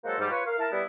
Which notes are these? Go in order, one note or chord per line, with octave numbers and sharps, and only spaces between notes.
F#3 G#3 A#3 F#4 A4 C5
G#2 G3
F4 B4 C#5
A#4 F5
E4 A#4 A5
G3 B3 E4